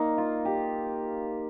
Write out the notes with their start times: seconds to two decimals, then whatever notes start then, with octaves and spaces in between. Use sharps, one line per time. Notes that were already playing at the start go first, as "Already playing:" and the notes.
Already playing: A#3 D#4
0.18 F4
0.45 G4